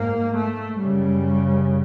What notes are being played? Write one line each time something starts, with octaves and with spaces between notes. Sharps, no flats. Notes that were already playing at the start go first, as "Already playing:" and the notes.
Already playing: G#2 A#3
A3
F#2 C#3 G3